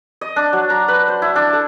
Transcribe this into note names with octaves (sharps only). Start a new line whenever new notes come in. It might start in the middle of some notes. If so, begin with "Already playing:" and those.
D#5
D4
F#3
A#5
B4
C5
E4
D4
A4